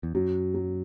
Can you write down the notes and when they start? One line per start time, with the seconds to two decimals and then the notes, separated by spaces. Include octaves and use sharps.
0.03 E2
0.15 F#2 F#3
0.54 F#3